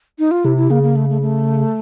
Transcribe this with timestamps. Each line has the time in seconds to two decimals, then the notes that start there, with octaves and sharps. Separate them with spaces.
0.19 D#4
0.31 F4
0.44 C3 E4
0.57 E4
0.70 C#3 A#3
0.83 A#3
0.96 A3
1.09 A3
1.22 A3